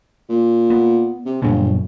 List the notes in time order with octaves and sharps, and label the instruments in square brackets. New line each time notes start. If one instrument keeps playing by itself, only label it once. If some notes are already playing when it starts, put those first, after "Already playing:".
[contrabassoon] A#2
[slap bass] B3
[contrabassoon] C3
[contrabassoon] G1 [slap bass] F#2 A#2 C#3